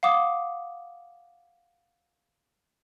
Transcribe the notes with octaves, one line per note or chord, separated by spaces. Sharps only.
F5 F#5 D6 D#6